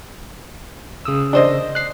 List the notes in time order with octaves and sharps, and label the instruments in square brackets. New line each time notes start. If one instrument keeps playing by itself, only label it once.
[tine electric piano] C#3 D#6 E6
[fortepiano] D4 C5 D#5
[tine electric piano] F#6 C7